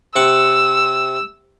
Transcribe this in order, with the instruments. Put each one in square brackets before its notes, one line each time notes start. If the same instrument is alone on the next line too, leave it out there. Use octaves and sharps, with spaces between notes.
[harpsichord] C3 F#5 C#6 [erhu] E6